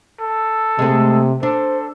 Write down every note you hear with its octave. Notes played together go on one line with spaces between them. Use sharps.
A4
C3 G#3 A3
D4 A4 C5